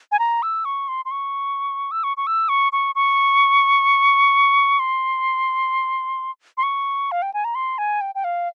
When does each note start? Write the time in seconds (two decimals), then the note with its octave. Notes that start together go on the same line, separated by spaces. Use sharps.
0.12 G#5
0.19 A#5
0.43 E6
0.65 C#6
0.88 C6
1.05 C6
1.11 C#6
1.91 E6
2.04 C#6
2.17 C#6
2.27 E6
2.49 C#6
2.73 C#6
2.95 C#6
4.79 C6
6.57 C6
6.63 C#6
7.12 F5
7.22 G5
7.34 G#5
7.45 A#5
7.55 C6
7.78 G#5
8.01 G5
8.15 G5
8.24 F5